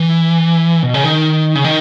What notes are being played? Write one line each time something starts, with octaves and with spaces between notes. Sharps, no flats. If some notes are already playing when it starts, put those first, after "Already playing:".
Already playing: E3
B2
C#3
D#3
C#3
D#3